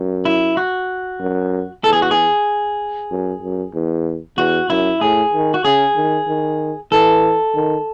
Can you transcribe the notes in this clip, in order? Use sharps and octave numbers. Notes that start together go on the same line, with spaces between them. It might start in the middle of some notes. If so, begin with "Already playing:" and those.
Already playing: F#2
E4
F#4
F#2
E2 A4
G#4
F#4
G#4
F#2
F#2
E2
E2 F#4
F#2 E4
A2 G#4
D#3
F#4
C#3 G#4
D#3
D#3
E3 A4
D#3